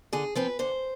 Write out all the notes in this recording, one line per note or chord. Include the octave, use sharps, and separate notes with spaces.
D3 G#4
F3 C4 B4
D3 C5